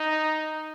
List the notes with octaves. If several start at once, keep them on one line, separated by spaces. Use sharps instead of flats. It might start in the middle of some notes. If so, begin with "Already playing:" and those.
Already playing: D#4